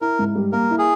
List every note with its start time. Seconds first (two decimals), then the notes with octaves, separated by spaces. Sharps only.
0.01 E4 A#4
0.19 G#2
0.35 G3
0.52 A#3 A#4
0.71 E4
0.78 G#4